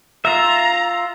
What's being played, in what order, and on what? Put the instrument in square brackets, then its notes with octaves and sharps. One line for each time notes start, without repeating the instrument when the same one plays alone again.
[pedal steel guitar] F4 E5 [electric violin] A#5